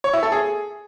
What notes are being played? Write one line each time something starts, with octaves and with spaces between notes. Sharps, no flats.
C#5
E4
A4
G#4